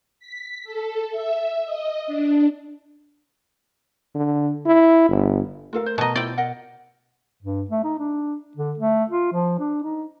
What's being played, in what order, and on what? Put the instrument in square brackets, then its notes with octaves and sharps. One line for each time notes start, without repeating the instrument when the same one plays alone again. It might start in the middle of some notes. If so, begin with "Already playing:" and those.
[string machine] B6
A4
E5
D#5
D4
[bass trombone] D3
E4
G1
[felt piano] A3 A#4 [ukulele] F4 A4 F5
[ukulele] C5
[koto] B2 D#5 [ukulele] A5 A#5
[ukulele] E4 F4 C5 [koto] D5 G5
[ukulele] A#4 D#5 F#5
[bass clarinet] G2
A3
D#4
D4
D3
A3
F4
F3
D4
D#4